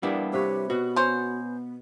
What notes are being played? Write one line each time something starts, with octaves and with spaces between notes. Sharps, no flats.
G3 A#3 B3 D4 E4 G4
C3 G4 B4 C#5
B2 B3 F#4
C#4 C5